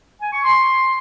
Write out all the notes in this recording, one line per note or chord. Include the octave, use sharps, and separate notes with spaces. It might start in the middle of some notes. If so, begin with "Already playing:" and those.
G#5
C#6
C6